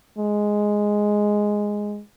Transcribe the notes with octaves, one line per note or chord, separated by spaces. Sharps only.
G#3